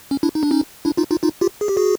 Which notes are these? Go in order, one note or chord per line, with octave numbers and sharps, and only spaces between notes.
C#4
D4 E4
D#4
D4
C#4 D#4
D4 E4
D#4 F4
D#4 F4
D#4 F4
F4 G4
G#4
G4
F#4 G#4